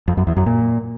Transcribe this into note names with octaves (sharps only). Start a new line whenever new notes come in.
F2
F#2
E2
F#2
A#2